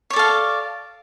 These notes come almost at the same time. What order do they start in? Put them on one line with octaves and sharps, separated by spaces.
C#5 D5 A4 F5